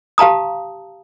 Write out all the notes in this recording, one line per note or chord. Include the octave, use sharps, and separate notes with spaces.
G4 F5 A5 A#5 D#6